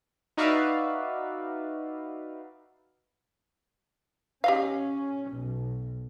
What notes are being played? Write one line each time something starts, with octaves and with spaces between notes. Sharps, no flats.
D#4 F#4 B4 D5 E5 F5
C#4 G4 D#5 F5
B1